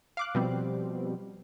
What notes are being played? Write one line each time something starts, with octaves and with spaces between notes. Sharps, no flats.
F5 D6 F#6
B2 F3 G3 C4